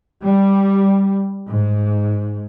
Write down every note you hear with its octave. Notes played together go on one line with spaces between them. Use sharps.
G3
G#2